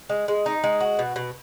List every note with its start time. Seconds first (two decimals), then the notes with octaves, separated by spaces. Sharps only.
0.10 G#3
0.28 G#3
0.46 D#4
0.64 G#3
0.80 F#4
0.99 B2
1.16 B2